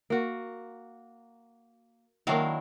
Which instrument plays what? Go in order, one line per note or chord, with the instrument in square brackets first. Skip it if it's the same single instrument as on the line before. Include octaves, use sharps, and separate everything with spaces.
[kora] A#3 F#4
[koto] D#3 F#3 F5 [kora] A#3 D4 E4